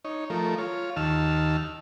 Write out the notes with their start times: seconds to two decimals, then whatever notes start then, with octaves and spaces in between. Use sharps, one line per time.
0.05 D#4 C#5
0.30 F3 A3 A#4
0.58 F4 C#5
0.96 D#2 D#3 A5 E6 F6